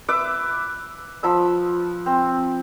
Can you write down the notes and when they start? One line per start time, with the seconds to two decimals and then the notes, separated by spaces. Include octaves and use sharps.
0.09 B4 E5 D6
1.23 F3 B5 E6
2.06 C4